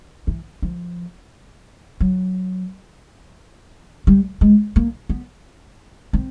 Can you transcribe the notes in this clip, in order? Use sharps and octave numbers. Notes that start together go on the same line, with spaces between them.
E3
F3
F#3
G3
G#3
A#3
B3
C4